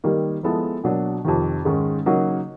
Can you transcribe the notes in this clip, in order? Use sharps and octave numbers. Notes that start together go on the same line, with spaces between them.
D#3 G3 A#3 D#4
F3 G#3 B3 E4 A4
B2 F#3 A#3 D4
F2 C3 D#3
G#2 D#3 G#3 C#4
C#3 F#3 A#3 D#4 F#4